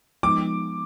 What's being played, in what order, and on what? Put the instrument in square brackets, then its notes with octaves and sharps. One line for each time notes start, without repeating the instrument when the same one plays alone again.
[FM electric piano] F3 G#3 B3 D#4 [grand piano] D6